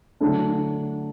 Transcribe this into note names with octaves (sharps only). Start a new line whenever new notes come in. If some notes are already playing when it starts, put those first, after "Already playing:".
D3 F#3 A3 D4